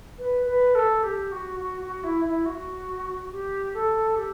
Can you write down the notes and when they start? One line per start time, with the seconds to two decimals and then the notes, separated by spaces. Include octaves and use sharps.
0.18 B4
0.46 B4
0.75 A4
1.03 G4
1.32 F#4
1.60 F#4
1.81 F#4
2.03 E4
2.25 E4
2.45 F#4
3.31 G4
3.74 A4
4.16 G4